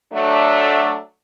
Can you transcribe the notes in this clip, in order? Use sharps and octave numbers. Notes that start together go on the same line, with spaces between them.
F#3 A3 D4